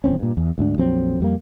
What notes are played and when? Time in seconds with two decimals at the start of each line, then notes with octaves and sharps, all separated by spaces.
0.04 D#1 E2 C4 C#4
0.19 G2 A#2
0.37 E2
0.58 D2 G#2 D4
0.78 A#1 F2 F#3 C4
1.20 F2 G3 A#3